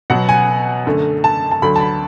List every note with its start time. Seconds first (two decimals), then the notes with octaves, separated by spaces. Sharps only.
0.10 B2 F#3 B3 F#5
0.29 G#5
0.86 F#2 D3 A3
1.24 A5
1.51 A5
1.62 D2 D3 F#3 B5
1.76 A5
1.81 B5